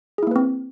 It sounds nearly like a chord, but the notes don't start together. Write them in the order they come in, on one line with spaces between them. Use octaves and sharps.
G#4 E4 A#3 B4 C4